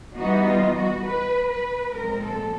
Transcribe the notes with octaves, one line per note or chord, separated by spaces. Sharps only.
E3 G3 B3 D#4 F#4
F4
F#4
B4
B4
A#2 F3 G#3 C4 A#4
A4